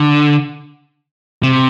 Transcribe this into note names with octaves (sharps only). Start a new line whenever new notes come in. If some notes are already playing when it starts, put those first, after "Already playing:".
Already playing: D3
C3